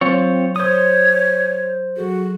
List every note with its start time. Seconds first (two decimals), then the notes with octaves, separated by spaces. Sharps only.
0.01 F#3 C4 F4 C#5
0.56 C5 C#5 D#6
1.97 F#3 F#4 G#4 A4